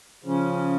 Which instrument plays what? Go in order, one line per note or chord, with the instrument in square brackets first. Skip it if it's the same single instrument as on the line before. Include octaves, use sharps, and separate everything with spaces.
[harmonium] C#3 F3 C#4